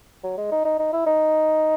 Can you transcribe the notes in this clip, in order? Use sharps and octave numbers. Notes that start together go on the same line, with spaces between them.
F#3
G#3
D#4
D#4
D#4
E4
D#4